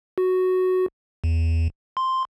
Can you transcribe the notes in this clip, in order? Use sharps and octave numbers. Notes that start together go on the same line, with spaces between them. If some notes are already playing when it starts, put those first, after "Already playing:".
F#4
E2
C6